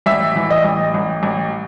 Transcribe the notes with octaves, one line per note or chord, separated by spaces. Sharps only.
A1 E5
E3
D#5
A1
A1
A1